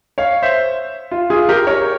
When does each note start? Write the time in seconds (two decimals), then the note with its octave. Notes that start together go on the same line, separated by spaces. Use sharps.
0.18 C#5 F5
0.42 C5 E5
1.11 F4
1.30 F4 G#4
1.49 G4 A#4
1.67 A#4 C#5